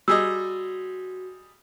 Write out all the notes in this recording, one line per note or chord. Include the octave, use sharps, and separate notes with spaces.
G3 F#4 G#4 D#5 E6